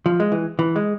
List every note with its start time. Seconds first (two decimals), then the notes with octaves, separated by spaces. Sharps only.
0.06 F3
0.20 G#3
0.32 E3
0.59 E3
0.76 G#3